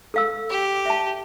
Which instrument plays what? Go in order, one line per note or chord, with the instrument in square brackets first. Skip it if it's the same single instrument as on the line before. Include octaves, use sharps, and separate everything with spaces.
[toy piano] A4 F5 E6
[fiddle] G4
[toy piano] E5 A5